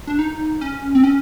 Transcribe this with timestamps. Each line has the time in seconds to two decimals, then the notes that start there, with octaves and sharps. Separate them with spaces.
0.07 D4
0.19 D#4
0.61 C#4
0.95 C4
1.03 C#4